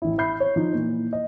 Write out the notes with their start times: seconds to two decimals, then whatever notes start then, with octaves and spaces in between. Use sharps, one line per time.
0.02 A1 E4
0.18 E5 B5 G6 C7
0.40 C#5
0.56 F3 D#4
0.74 A#2 E3
1.13 D#5